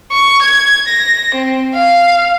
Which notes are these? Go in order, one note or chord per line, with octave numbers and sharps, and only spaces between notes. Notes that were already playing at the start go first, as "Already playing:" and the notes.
C#6
G#6
A#6
C4
F5